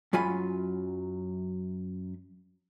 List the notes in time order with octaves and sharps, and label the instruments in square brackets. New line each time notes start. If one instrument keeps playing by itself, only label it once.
[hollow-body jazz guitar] F#2 F#3 F4 G#5 B5